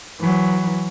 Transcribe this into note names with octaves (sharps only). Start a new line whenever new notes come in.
E3 F#3